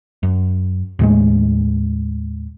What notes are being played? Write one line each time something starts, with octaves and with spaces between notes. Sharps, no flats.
F#2
D#2 A2 G#3